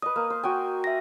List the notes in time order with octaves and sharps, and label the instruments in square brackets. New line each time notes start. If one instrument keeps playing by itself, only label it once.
[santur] B4 D#5 [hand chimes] D#6
[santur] A#3
C5
F#4 G5 G#5
[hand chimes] E5 A#6